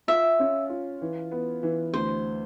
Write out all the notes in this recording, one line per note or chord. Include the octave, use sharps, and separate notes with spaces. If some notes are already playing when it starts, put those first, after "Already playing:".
F4 E5
C#4
F4
E3
B3
E3
D2 C5